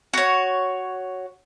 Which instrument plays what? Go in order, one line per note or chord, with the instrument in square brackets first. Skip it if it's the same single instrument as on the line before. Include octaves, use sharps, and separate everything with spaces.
[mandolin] F#4 C#5